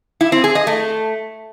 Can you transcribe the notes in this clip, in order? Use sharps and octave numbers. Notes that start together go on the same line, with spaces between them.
E4
C4
G#4
D#5
A3